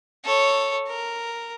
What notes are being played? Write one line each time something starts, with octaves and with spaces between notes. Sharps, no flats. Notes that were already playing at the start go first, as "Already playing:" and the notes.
A4 C#5
A#4